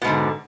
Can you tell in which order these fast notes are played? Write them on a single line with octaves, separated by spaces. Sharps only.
B2 G#2 D3